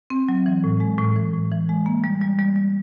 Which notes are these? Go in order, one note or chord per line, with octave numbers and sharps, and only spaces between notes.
C4
F#3
E3
A2
G#3
A2
E3
A2
E3
G#3
A#3
G3
G3
G3
G3